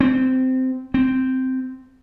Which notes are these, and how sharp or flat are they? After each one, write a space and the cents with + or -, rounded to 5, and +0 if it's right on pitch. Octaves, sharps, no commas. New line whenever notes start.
C4 -15
C4 -10